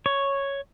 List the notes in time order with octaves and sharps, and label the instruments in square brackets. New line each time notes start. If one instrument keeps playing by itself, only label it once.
[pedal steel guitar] C#5